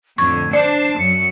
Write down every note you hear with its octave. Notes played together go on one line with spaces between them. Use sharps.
F2 A2 D3 C#6 G#6
D4 C5 D5 A5 C7
F#2 F#3 C#7